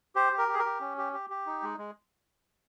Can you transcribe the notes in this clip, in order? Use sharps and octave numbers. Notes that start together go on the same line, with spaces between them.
G4 C5
G4
A#4
G4
G#4
A#4
G4
C#4
G4
G4
G4
D#4
G#3
G#3